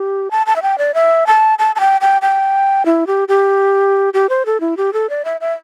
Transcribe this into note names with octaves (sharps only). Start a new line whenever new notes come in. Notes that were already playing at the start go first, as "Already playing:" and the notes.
Already playing: G4
A5
A5
E5
G5
D5
E5
A5
A5
A5
G5
G5
G5
E4
G4
G4
G4
C5
A4
E4
G4
A4
D5
E5
E5